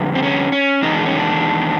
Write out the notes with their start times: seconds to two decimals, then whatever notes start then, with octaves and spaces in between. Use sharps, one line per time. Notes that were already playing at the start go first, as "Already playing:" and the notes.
Already playing: F2 D3 G3 B3
0.15 C4
0.23 C#4
0.52 C#4
0.83 E2 C3 D#3 G#3 D#4
0.94 D4
1.06 C#4
1.17 D4